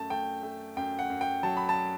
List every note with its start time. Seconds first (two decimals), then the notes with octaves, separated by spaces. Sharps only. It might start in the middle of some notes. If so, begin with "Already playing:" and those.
Already playing: F#2 A3 A5
0.10 A3 G5
0.43 A3
0.77 F#2 G5
0.99 F#5
1.10 F#2
1.21 G5
1.43 F#3 A5
1.57 B5
1.69 A5